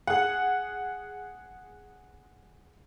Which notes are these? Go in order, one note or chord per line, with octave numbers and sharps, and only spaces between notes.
G#4 F#5